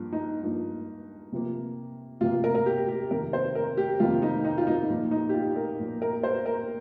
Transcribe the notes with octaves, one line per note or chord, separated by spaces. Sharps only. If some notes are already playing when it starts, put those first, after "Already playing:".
Already playing: G2 F3 A#3
D#4
G2 F3 A#3
C3 F3 A#3
C3 F3 A#3 F4
A#4
A#4
G4
G4
F2 C3 D#3 A#3 A#4
C5
A#4
G4
F2 C3 D#3 A#3 F4
D#4
D#4
F4
D#4
A#2 F3 A#3
D#4
G4
F4
A#4
A#2 F3 A#3
A#4
C5
A#4